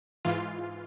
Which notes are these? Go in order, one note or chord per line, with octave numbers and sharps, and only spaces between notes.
G#2 E3 F4